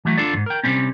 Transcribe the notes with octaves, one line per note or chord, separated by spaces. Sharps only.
E3 F#3 A3
D4 F4 A4 D5
D#2 G#2
A#4 G5
C3 F#3 G3 C4 C#4